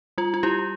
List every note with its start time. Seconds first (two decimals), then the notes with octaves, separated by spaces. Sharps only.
0.18 G3 F4
0.34 F4
0.43 G3 E4 G4